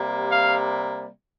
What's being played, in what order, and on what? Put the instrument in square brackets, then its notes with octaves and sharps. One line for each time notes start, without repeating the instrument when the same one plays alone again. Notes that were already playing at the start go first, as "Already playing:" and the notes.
Already playing: [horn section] C3 G3 A#3
F5